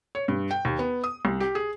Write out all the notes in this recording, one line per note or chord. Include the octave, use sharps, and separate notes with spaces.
C#5
G2
G5
D#2
B3
D#6
C2
G4
G#4